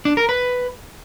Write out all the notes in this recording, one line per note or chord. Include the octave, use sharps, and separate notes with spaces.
D4
A#4
B4